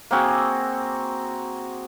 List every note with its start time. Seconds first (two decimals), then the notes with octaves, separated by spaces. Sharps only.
0.11 A#3 C4 F#4 G#4